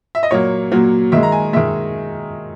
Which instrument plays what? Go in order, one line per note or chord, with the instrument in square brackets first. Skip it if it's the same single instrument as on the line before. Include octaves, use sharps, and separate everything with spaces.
[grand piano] E5
D#5
A#2 F#3 A#3 C#5
A#2 F#3 A#3
D#3 G#3 E5
A#5
G#5
D#3 G#3 E5